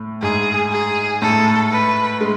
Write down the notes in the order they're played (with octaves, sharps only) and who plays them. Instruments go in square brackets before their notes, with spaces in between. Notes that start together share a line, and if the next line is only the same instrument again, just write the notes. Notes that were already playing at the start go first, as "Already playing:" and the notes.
Already playing: [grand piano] A2
[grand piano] G#2 [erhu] G#4
[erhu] G#4
[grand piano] A2 [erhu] A4
[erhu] B4
[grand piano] G#3